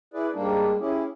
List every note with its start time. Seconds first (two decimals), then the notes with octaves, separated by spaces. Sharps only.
0.14 E4 G#4 B4 D5
0.34 G#2 G3 A#3 D4
0.80 C#4 E4 G4 G#4